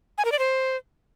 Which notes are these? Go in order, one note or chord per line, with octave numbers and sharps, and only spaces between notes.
G#5
A#4
D5
C5